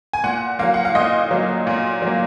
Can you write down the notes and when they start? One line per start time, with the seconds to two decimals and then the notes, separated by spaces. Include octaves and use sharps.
0.13 G#5
0.24 A#2 F#5
0.59 F#3 A#3 F5
0.74 F#5
0.85 F5
0.95 A#2 D#5
1.31 F#3 A#3
1.67 A#2
2.02 F#3 A#3